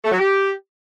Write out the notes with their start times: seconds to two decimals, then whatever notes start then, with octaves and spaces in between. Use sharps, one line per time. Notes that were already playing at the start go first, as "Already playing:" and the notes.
0.05 A3
0.12 F#3
0.19 G4